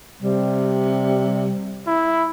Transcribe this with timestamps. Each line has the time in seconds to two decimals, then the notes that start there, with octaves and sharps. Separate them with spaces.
0.23 C3 G3
1.87 E4